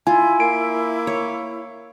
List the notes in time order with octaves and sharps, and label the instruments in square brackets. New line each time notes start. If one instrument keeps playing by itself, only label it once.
[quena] E4 [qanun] F4 [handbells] G#5
[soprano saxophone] A#3 [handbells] D7
[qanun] C#5